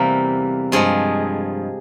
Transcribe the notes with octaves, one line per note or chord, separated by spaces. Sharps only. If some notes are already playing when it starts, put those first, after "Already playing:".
Already playing: E2 C3 G3 A#3
G2 F3 G#3 G#4